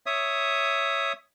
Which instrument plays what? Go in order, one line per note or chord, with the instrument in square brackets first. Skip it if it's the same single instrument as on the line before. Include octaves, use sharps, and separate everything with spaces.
[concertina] C#5 E5 D#6